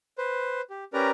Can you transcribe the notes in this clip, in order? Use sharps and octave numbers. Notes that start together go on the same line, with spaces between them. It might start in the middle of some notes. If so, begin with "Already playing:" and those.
B4 C5
G4
C#4 G4 A#4 B4 D5 A#5